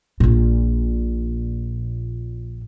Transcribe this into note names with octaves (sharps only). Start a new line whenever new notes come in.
A#1 A#2